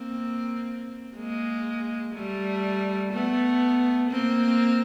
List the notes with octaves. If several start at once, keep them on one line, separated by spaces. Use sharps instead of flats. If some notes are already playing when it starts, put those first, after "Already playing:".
Already playing: A#3 C4
G#3 A#3
G3 A3
A3 B3
A#3 C4